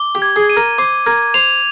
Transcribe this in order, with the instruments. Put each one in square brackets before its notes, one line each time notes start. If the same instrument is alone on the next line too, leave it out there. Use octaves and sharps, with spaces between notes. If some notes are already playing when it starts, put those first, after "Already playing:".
Already playing: [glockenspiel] D6 G7
[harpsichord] G4
[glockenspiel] G#6
[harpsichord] G#4
[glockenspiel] D#7
[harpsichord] A#4
[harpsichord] C5 [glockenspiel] D6
[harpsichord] A#4 [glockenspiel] G#6
[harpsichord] C5 [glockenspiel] F7